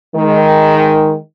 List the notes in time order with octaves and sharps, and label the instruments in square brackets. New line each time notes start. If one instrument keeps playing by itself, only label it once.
[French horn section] D#3 G#3